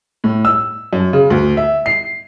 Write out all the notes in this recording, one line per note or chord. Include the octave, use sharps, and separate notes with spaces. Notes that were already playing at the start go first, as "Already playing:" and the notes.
A2
E6
F#2
C#3
D2
E5
C7